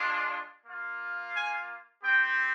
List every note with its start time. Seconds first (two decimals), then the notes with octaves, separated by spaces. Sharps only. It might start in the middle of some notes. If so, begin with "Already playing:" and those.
Already playing: G#3 D4 F4
0.66 A#3 F4
1.35 G#5
2.03 C4 G4 G5